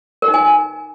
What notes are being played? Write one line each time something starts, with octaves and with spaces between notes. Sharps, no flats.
A#4
D#4
G#5